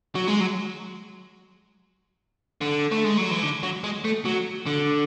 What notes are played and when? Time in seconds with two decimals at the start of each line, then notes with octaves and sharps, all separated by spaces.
0.15 F#3
0.28 G#3
0.40 F#3
2.61 D3
2.91 A3
3.04 G#3
3.17 F#3
3.31 E3
3.43 D3
3.63 F#3
3.84 G#3
4.05 A3
4.25 F#3
4.66 D3